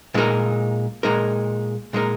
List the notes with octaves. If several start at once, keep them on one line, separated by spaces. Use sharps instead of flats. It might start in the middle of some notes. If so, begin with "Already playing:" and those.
A#2 G#3 D#4 A#4
A#2 G#3 D#4 A#4
A#2 G#3 D#4 A#4